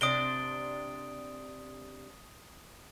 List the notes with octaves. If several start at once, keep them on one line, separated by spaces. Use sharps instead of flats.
C3 D4 C5 D#6 D7 G7